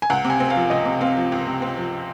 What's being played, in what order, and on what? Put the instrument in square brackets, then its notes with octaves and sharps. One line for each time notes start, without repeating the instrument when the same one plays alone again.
[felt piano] G#5
[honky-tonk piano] C#2 [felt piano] F#5
[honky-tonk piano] C3
[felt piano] G#5
[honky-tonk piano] C4
[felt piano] F5
[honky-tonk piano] F3
[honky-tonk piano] C#2 [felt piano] D#5
[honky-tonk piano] C3
[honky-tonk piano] C4 [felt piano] F5
[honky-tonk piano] F3
C#2
C3
C4
F3